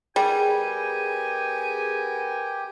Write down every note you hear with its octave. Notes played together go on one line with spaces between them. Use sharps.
G3 B3 G4 G#4 A#4 G#5